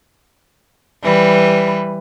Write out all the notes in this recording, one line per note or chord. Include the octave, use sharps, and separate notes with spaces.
E3 G3 B4